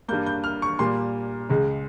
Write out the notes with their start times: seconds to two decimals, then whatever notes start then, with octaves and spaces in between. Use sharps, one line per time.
0.08 G2 G3 A#3 G6
0.26 G6
0.44 F6
0.62 C#6
0.79 A#2 G3 A#3 C6
1.49 C#2 C#3 G#3